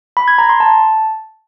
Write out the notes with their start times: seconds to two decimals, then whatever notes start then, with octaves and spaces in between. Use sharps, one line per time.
0.17 B5
0.28 G#6
0.38 A#5
0.49 C6
0.60 A5